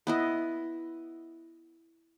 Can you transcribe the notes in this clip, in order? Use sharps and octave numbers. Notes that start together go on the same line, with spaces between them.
B3 E4 D#5